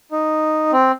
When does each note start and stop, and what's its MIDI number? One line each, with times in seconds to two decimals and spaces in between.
0.11 0.71 63
0.72 0.91 60